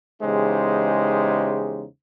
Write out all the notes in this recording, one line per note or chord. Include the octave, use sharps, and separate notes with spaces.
E2 C#3 G#3 D#4 G4 C5